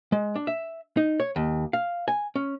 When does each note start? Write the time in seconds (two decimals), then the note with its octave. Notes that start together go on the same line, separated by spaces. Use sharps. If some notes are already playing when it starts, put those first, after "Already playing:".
0.12 G#3
0.36 D4
0.47 E5
0.97 D#4
1.20 C#5
1.36 D#2
1.73 F5
2.08 G#5
2.36 C#4